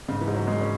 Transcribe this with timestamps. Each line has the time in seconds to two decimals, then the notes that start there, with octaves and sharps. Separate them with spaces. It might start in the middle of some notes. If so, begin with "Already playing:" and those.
0.08 G#2 C#3
0.21 E3
0.28 G#2
0.34 F#3
0.47 G#2 G#3
0.61 C#4